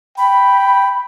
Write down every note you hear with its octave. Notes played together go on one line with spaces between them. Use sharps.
G5 B5